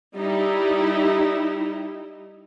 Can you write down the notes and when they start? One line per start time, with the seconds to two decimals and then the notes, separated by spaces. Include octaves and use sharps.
0.15 G3 D#4 E4